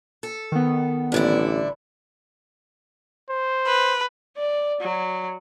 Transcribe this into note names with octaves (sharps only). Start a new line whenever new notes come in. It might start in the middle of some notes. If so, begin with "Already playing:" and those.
A4
D#3 B3
A1 G2 D3 E4
C5
B4
D5
F#3